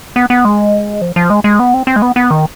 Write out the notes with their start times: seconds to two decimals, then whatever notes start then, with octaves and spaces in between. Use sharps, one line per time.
0.16 B3
0.30 B3
0.45 G#3
1.01 F3
1.16 F3
1.30 G#3
1.44 G#3
1.59 B3
1.74 C4
1.87 C4
1.96 G#3
2.02 B3
2.16 B3
2.31 D#3